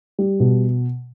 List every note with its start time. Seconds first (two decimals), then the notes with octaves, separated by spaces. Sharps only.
0.19 G3
0.40 B2